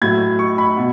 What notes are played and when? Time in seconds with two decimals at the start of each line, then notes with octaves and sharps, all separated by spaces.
0.02 A2 F#3 A3 G#6
0.39 C#6
0.58 B5
0.77 B2